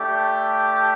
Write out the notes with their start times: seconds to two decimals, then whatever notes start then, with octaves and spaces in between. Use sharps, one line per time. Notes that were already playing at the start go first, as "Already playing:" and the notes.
Already playing: A3 D4 G4